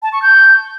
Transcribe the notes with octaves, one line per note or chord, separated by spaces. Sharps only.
A5
C#6
G6